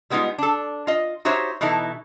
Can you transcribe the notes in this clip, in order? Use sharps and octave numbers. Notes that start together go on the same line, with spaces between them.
G3 G#3 B3 D#4 F4
D4 A4
F4 D#5
D#4 F#4 G4 C5 C#5 E5
B2 E3 D#4 E4 A4